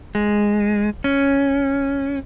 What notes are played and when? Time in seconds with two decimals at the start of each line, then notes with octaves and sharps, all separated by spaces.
0.15 G#3
1.04 C#4